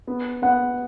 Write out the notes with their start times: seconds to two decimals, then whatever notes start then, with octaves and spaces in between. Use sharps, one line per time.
0.07 B3
0.42 B3 F#5